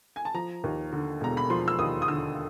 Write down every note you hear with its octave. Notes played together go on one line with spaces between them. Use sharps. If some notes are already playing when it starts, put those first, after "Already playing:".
G#5
A5
F3 A#5
D#2
D3
E1 A#5
B5
F3 C6
E6
D#2 D#6
D#6
D3 E6